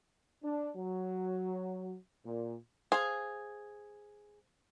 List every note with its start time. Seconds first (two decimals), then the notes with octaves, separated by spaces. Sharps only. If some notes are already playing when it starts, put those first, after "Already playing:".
0.43 D4
0.76 F#3
2.25 A#2
2.92 G#4 C5 F5 G#5